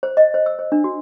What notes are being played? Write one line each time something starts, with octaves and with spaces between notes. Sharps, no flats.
C5
D#5
C5
E6
C5
D4
F#4